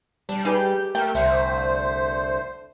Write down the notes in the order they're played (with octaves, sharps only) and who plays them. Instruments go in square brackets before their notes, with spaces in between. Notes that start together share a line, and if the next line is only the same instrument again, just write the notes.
[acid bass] G3 [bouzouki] D4
[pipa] D#4 G#4 B4 [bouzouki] G4 [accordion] G6
[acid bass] A3 [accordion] A#4 [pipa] G5
[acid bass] C2 [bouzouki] D3 A3 [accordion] C5